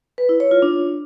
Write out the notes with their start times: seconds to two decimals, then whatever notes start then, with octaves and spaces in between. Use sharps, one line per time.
0.18 B4
0.29 E4
0.40 C#5
0.51 F4
0.62 D4